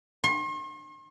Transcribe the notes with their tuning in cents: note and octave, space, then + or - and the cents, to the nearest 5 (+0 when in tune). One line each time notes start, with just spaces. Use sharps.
C6 +45